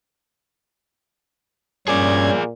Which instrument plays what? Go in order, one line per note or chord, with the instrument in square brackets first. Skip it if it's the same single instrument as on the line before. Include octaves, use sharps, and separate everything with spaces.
[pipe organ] G2 C#4 G#6 [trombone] A#2 [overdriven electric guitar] G#4 D5